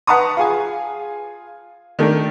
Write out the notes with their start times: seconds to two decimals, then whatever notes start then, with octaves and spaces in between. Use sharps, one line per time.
0.07 B4 F#5 A5 A#5 C#6 D#6
0.37 F4 G#4 G#5
1.99 D#3 A3 D4 A#4